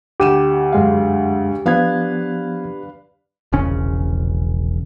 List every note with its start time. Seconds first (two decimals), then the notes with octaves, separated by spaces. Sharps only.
0.20 D2 G4 D#7 E7
0.73 F#2 G#3 F5
1.66 F3 B3 D4 B4 F5 G#6
3.53 E1 A#1 C#3 C#4